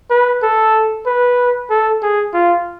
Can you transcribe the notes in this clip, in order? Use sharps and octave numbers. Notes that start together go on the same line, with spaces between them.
B4
A4
B4
A4
G#4
F4